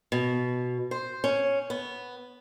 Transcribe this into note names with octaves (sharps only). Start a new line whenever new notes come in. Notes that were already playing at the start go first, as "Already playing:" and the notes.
B2
C5
C#4
B3